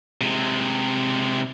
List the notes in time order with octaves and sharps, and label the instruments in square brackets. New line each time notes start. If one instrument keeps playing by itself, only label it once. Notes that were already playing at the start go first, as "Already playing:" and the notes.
[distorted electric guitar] C3 G#3